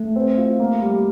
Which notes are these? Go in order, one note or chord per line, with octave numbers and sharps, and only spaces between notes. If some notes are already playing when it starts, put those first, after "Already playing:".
Already playing: A3
C4
F4
A#3
G3